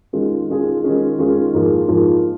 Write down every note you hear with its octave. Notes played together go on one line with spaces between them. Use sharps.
D#3 G#3 C#4 F4 G#4
D#3 G#3 C#4 F4 G#4
D#3 G#3 C#4 F4 G#4
D#3 G#3 C#4 F4 G#4
G#2 F3 A#3 F4 G#4
G#2 F3 A#3 F4 G#4